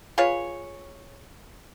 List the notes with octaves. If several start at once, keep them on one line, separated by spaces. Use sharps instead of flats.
F4 G#4 B4 C#5